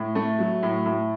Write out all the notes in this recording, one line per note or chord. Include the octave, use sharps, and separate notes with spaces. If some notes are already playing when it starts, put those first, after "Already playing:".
Already playing: A2
A3
F#3
A2
A2